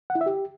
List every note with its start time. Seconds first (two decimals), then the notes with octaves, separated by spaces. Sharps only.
0.10 F#5
0.15 E4
0.21 E5
0.26 G4